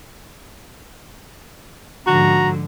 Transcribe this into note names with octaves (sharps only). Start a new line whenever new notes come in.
G#2 D3 F3 F#4 A#5